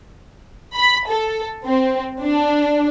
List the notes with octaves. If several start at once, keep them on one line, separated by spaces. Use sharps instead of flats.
B5
A4
C4
D4